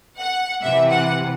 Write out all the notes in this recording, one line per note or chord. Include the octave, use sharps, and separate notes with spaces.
F#5
C3 E3 E5
F#5